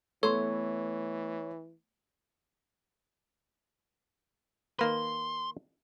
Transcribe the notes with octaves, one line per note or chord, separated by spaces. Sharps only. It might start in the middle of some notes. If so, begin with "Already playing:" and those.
E3 A3 B3 A4 C#5 C6
D#3 A#3 B4 C6